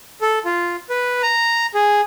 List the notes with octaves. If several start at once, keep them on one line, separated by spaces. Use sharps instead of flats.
A4
F4
B4
A#5
G#4